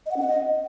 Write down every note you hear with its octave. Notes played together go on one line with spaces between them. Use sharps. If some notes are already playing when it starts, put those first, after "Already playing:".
D#5
F#5
C#4
F#5
D#5